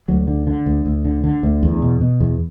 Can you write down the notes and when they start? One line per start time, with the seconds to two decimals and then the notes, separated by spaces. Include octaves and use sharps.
0.08 D2 F#3
0.27 D3
0.47 D3
0.66 D2
0.85 D2
1.05 D3
1.24 D3
1.43 D2
1.63 E2
1.82 B2
2.01 B2
2.20 E2